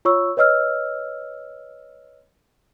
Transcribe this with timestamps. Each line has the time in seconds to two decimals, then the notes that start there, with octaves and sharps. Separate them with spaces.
0.05 F4 C#5 C#6 E6
0.37 B4 C#5 D#5 E6 F6